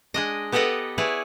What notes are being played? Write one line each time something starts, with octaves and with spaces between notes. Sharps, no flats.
G#3 D4 D#5
B3 G4 A4 B4 D#5 F#5
E4 G#4 B4 C#5 D5